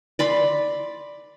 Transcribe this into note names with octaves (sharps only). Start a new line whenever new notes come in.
D5 B5 C6